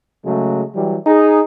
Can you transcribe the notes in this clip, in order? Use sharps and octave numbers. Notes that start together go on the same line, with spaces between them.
C#3 F#3 G#3 A3
E3 F#3 G3
D#4 G#4